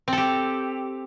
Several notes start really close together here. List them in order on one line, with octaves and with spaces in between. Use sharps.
C4 A4 G4